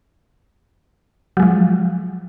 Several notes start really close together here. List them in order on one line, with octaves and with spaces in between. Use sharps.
F#3 G#3 F3